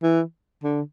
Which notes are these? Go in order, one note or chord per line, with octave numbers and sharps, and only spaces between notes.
E3
D3